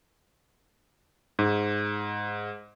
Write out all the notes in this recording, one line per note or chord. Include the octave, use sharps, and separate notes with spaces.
G#2